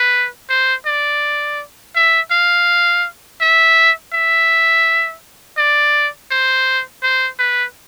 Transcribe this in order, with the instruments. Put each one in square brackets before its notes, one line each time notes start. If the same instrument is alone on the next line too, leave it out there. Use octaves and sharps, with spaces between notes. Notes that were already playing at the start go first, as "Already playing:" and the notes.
Already playing: [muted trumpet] B4
C5
D5
E5
F5
E5
E5
D5
C5
C5
B4